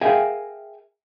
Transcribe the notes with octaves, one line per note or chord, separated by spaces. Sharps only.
G#4 A#4 E5 F5 G5 G#5